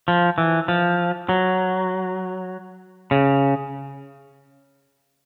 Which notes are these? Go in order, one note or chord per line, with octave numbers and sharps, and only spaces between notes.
F3
E3
F3
F#3
C#3